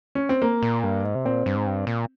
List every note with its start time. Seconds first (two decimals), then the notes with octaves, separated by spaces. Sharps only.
0.15 C#4
0.29 C4
0.42 A#3
0.63 A#2
0.84 G2
1.04 G#2
1.15 C3
1.25 A#2 C4
1.46 G2
1.56 G#2
1.67 G2
1.87 A#2